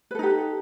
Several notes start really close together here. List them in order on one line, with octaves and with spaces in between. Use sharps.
B4 A4 D#4 G4